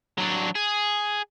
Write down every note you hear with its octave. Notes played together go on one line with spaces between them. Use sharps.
F#3 D4
G#4